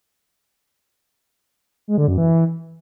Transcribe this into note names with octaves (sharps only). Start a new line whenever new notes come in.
G#3
D3
F#2
E3